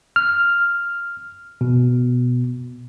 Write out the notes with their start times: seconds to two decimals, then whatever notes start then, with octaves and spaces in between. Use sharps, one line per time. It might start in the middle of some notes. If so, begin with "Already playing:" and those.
0.16 F6
1.61 B2